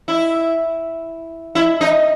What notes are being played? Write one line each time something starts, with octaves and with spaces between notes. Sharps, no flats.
E4
E4
D#4